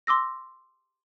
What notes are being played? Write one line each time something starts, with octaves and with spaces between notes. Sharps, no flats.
C6 D6 E6 A#6